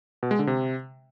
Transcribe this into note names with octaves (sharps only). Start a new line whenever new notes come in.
B2
G#3
D3
C3